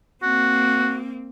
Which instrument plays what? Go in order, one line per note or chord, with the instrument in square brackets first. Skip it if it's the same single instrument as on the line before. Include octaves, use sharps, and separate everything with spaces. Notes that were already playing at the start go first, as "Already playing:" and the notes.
[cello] A#3 C4 [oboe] F#4